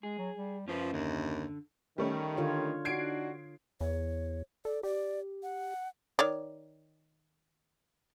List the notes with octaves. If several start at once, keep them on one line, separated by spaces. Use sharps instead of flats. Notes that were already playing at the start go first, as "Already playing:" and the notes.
G#3 G#4
F#3
G3
F#2 F3 C#4 F4 B4
D#2 D3
D#3 G3 A3 C#4
D3 F4 C#5
D4 D#4 F#4 G#6 C7 D7
E2 C#5
A4 D5
G4 D5
F#5
D#3 C#5 D5